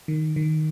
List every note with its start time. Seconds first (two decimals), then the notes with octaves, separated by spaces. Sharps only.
0.08 D#3
0.36 D#3